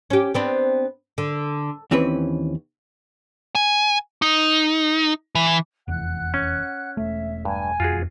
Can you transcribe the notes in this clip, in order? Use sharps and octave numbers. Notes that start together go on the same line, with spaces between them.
C#4 G4
B3 C4 D4
D3
D#2 E3 C4 C#4 B4
G#5
D#4
E3
F1 E2 F#5 F#6
C#4
E1 A3 E5
G2 G#5
E1 F2 F4 F#4 G#4